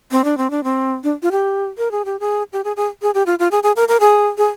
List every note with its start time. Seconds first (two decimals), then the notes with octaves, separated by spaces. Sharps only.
0.11 C4
0.24 D4
0.38 C4
0.50 D4
0.64 C4
1.04 D4
1.23 F4
1.32 G4
1.78 A#4
1.91 G#4
2.05 G4
2.20 G#4
2.53 G4
2.64 G#4
2.77 G#4
3.02 G#4
3.14 G4
3.26 F4
3.39 F4
3.51 G#4
3.63 G#4
3.76 A#4
3.88 A#4
4.00 G#4
4.38 G#4